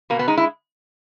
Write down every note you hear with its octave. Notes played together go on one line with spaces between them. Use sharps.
B2 A#3
B3
G#3 D#4
E4